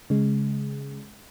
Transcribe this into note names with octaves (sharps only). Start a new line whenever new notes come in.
C#3 G#3